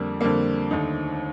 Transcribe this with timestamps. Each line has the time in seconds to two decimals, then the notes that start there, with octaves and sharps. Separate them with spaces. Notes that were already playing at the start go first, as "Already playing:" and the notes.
Already playing: F2 D3 G3 A#3
0.21 F2 D3 G3 A#3
0.71 D#2 D3 A3 D#4